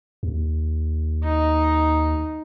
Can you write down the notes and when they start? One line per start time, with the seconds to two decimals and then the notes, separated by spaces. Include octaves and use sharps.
0.23 D#2
1.24 D#4